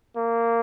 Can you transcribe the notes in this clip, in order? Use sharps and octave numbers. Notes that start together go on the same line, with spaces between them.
A#3